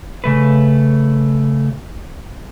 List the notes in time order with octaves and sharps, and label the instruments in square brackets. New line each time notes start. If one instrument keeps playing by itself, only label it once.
[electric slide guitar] C#3 A3 B4